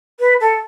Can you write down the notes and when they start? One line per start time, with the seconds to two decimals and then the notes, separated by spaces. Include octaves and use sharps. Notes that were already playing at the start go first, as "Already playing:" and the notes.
0.20 B4
0.41 A4